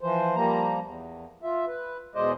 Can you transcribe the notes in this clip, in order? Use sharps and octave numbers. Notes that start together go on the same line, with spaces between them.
E3 F3 C5
F3 G3 A#3 A#5
E2
F4 E5
B4
E2 B2 G#3 C5 D5 D#5